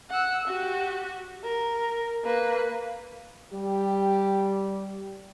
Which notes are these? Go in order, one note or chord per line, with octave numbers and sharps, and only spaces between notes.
F#5 E6
F#4 G4
A#4
A#3 B4
G3 G4